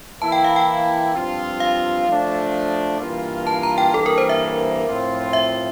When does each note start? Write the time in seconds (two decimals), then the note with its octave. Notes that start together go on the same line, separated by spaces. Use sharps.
0.21 E3 A#3 E4 A5
0.32 G5
0.44 F5
0.56 G5
1.15 G2 F3 C4 F4
1.60 F5
2.08 F3 A3 D4
3.00 G2 E3 A#3 F4
3.47 A5
3.63 A#5
3.78 G5
3.94 G2 E3 A#3 A4
4.06 A#4
4.18 C5
4.29 E5
4.87 A2 F3 C4 F4
5.33 E5